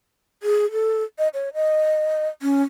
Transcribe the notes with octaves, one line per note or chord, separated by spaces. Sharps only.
G#4
A4
D#5
C#5
D#5
C#4